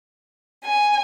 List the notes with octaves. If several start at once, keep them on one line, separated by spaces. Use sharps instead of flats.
G#5